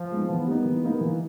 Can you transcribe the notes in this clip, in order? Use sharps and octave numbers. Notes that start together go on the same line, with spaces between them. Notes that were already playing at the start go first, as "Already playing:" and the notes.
Already playing: F3
G#3 B3 D#4
E3 B3
G3 A#3 D#4
E3
G3 A#3 D#4
E3